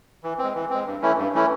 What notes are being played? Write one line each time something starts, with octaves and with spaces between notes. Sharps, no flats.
E3
G#3 C4
E3
G#3 C4
G2
E3 A3 C#4 E4
G2
E3 A3 C#4 E4